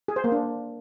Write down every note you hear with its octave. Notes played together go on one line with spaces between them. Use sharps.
G#4
C5
A#3
D4